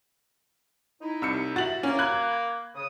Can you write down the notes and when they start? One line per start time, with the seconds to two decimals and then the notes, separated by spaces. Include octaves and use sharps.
1.02 D#4 E4
1.22 C2 E6 C#7
1.56 F#4 E5 A6 F#7
1.83 A#3 C#4
1.99 B5 F#6 G#6
2.75 C#3 D#6